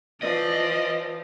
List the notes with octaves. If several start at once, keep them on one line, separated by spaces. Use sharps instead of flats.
E3 F3 D5 D#5